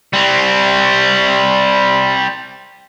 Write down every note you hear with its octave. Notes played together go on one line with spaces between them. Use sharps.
G3 C4